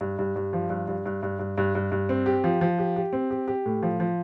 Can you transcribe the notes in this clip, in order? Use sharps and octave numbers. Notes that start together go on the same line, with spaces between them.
G2
G2
G2
F3
G2
G2
G2
G2
G2
G2
G2
G2
C4
G4
F3
F3
G4
G4
C4
G4
G4
A2
F3
F3